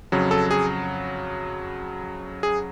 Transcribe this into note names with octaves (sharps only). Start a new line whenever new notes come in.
F2 C#3 F#3
A4
G#4
G#4